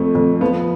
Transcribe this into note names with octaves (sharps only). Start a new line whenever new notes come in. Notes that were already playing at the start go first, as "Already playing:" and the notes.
Already playing: F2 A3
F2
F3 B3